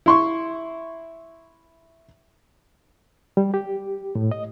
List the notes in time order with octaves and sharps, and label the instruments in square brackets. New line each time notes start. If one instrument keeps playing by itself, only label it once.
[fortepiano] E4 C6 C#6
[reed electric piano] G3
G4
A2
D#5